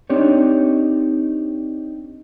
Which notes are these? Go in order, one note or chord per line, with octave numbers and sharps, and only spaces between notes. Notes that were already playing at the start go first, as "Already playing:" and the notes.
C4 D4 D#4 G4 C#5